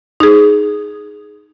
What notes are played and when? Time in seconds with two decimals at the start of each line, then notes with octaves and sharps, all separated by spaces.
0.20 D#4 G#4